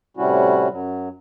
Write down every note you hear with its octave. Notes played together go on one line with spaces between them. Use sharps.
A2 C3 G3 C#4 E4 F#4
F#2 F#3